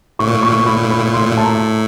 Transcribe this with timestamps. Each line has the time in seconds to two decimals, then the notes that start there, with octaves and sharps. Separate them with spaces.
0.19 A2 C#6
0.27 A#2
0.36 A2
0.43 A#2 C#6
0.52 A2
0.60 A#2
0.66 A2 B5
0.77 A#2
0.85 A2
0.91 A#2 B5
1.00 A2
1.08 A#2
1.13 A2 C6
1.25 A#2
1.33 A2 A5
1.44 A#5